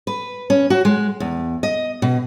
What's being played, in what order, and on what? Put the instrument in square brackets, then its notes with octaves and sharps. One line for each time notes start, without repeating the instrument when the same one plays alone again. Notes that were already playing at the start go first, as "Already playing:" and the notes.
[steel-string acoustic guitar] B4
C#4
F#4
G#3
E2
D#5
B2